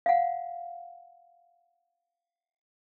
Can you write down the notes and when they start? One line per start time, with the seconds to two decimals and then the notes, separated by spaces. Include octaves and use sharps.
0.06 F5 F#5